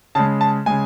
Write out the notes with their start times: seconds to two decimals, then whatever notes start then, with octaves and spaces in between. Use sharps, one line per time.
0.15 C#3 G#3 A5
0.41 A5
0.66 C#3 G#3 G#5